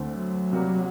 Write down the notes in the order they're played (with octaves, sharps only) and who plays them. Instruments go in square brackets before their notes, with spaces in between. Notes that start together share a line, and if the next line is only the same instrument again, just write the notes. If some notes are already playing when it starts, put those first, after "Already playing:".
Already playing: [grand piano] D2 D3 A3 C4
[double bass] F#3
[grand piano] C3 G3 A#3 F#4